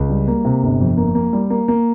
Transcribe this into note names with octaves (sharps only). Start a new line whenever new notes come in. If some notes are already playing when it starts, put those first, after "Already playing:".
Already playing: C#2
G3
A#3
C3
G1
F2
A#3
A#3
G3
A#3
A#3